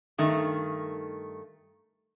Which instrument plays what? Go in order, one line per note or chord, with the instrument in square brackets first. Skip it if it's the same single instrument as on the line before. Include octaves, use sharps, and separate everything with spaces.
[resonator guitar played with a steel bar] G2 D#3 A3